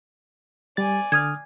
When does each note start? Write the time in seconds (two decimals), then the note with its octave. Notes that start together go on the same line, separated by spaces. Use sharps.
0.77 G3 D5 G#5 A6
1.12 D3 D#6 F6 G#6